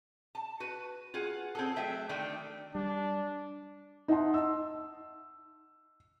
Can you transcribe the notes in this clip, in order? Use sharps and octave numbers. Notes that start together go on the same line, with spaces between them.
A5
F#4 B4
F4 G#4 F#5
C4 G#4 A4
F#3 A3 E5 G5
D3 D#3 A3 D4 G5
G3 D4
D#4 D#5 E5 F#5 A5 C6
E6